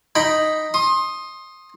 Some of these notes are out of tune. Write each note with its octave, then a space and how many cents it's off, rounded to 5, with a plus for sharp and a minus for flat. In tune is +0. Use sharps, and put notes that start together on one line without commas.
D#4 +0 G5 +0 B5 +0
C6 +25 D#6 +0